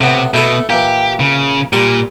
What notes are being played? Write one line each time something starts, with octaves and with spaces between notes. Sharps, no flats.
A2 C3 B3
B2 A3 E4 A4
A#2 E3 G4
C#3
A#2 G3 C6